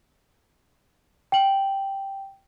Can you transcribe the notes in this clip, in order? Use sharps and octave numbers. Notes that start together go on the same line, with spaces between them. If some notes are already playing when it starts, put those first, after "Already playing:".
G5 F#7